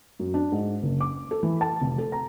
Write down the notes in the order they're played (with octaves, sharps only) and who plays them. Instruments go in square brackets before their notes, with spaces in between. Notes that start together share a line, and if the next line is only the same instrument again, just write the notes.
[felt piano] F#2
D4
G#2
F#1
D6
A4
E3
A5
F1
A4
A#5